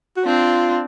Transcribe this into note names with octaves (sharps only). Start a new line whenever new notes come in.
F#4
C4 D4 F4